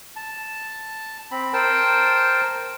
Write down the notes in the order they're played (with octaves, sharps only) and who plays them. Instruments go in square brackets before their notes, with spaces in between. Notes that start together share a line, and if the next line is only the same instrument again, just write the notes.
[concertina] A5
C4 B5
A#4 C5 G5 A5